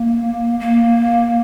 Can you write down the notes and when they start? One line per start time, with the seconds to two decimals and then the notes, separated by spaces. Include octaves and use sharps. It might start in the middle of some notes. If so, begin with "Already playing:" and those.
Already playing: A#3
0.60 A#3